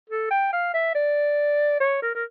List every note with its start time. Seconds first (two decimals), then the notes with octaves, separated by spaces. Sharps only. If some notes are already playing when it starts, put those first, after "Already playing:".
0.10 A4
0.31 G5
0.53 F5
0.74 E5
0.95 D5
1.80 C#5
2.02 A#4
2.15 A#4